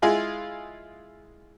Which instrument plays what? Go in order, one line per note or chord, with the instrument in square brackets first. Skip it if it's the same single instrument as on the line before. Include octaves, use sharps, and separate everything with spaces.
[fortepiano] G#3 E4 F4 G#4